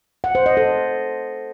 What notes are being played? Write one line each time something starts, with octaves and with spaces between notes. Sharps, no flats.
F#5
C5
D#5
A4